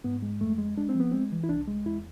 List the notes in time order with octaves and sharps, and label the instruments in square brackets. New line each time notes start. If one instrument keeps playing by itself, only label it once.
[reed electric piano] G#2 B3
G#3
F2 A3
G#3
G#3 D4
C4
F3
B3
G#3 C4
E3
E4
C2 D4
G#3
E2 E4